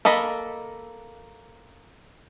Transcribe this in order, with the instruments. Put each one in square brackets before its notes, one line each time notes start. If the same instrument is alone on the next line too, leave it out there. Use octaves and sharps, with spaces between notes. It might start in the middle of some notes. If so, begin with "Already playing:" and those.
[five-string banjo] A#3 A4 D#5 B5